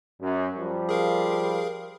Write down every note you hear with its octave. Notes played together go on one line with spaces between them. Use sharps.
F#2
F3 G3
G#4 A#4 F5